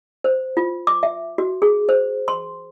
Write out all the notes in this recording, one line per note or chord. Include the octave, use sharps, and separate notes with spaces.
C5
F4
D6
E5
F#4
G#4
C5
C6